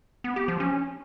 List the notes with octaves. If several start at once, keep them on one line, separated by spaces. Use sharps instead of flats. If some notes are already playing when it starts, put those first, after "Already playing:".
B3
G4
F3
C#4